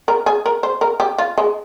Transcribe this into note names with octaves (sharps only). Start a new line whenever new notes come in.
A#4
G#4
A#4
C5
A#4
G4
F4
G#3